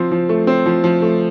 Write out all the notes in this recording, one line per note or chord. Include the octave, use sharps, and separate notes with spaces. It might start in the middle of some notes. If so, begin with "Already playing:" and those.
Already playing: F3 C4
F3
A3
C4
F3
F3
A3